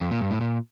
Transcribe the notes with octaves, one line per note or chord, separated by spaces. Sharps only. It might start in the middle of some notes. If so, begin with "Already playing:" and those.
F2
A#2
G2
A2
A#2